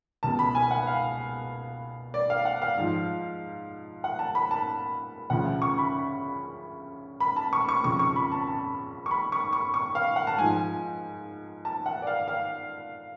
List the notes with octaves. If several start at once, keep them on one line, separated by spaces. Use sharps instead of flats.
C#2 B2 A5
B5
G#5
F#5
F5
D5
F5
F#5
F5
G#2 F3
F#5
A5
B5
A5
D2 C#3 F3 F#5
C#6
B5
B5
A5
C#6
C#6
F2 C#3 F3 C#6
C#6
B5
A5
A5
C#6
B5
C#6
C#6
C#6
F5
F#5
A5
G#2 F3 G#5
A5
F#5
D5
F5
F5